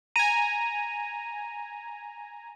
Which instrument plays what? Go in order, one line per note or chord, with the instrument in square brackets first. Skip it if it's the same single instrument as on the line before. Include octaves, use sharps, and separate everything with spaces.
[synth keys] G#5 A#5 [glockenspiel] D#7